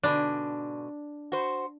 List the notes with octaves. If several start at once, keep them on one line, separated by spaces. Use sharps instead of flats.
G#2 B2 D3 D4
F#4 C5